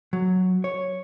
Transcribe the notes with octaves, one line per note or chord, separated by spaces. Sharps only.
F#3
C#5